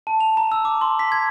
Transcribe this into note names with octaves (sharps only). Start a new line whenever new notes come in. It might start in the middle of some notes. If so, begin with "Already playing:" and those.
A5
F7
A#5
E6
D6
C6
B6
G#6